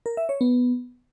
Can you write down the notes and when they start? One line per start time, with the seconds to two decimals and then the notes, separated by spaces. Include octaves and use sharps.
0.06 A#4
0.17 E5
0.29 C#5
0.41 B3